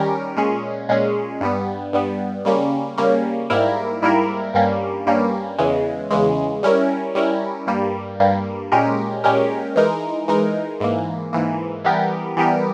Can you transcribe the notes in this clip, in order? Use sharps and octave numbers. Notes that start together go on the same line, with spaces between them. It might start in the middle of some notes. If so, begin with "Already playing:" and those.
Already playing: D#3 G3 C#4 G4 A#4
A#2 G#3 C#4 G#4
A#2 G#3 C#4 G#4
G2 G3 B3
G2 G3 B3
C#3 G3 A#3 C#4
C#3 G3 A#3 C#4
G#2 G3 A#3 E4 A#4
G#2 G3 A#3 E4 A#4
G2 G3 A#3 C#4
G2 G3 A#3 C#4
E2 C#3 E3 G#3
E2 C#3 E3 G#3
G3 C#4 E4 A#4
G3 C#4 E4 A#4
G2 G3 A#3
G2 G3 A#3
A#2 G#3 C#4 G4 A#4
A#2 G#3 C#4 G4 A#4
E3 G#3 D#4 A#4
E3 G#3 D#4 A#4
G#2 E3 A#3
G#2 E3 A#3
E3 G3 B3 G4 A#4
E3 G3 B3 G4 A#4